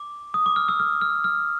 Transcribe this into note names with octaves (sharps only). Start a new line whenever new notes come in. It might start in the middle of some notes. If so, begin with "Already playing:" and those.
Already playing: D6
D#6
D6
F6
E6
F6
F6
F6